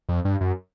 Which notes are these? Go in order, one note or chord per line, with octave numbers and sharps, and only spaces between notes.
F2
G2
F#2